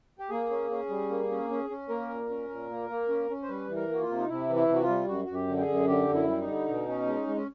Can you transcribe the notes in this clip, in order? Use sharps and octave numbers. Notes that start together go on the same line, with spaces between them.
G4
A#3 G#4
C#4
C#4
G3
A#3
C#4
C#4
C#4
A#3 A#4
A#2
C#4
A#2
A#3
A#3
C#4
C#4
C5
G3 B4
E3
A#4
A#3 F#4
F4
C3
D#4
C3 E4
E3
E4
C3
F#4
F4
G3
F#2 F#4
F#2 F#4
G4
D3
G4
G#4
F#2
D3 G4
F#2
E4
G3
D#4
D3
B2
C#4
G#3
G#3
C#4